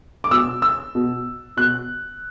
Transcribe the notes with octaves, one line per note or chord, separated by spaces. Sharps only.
D6
B2 E6
E6
B2
B2 F#6